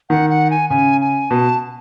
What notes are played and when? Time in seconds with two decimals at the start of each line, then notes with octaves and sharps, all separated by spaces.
0.10 D#3 F#5
0.30 F#5
0.50 G#5
0.70 C#3 G#5
1.01 G#5
1.31 B2 A5